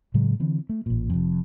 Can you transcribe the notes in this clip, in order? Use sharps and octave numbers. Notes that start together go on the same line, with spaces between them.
A2 C#3 F#3 G#3
D3 E3 C4
A3
A1 A#2
F1 F2